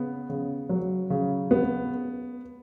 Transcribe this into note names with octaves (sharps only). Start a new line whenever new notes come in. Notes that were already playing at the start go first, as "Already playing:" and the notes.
Already playing: C#3 B3
C#3
F#3
C#3
B3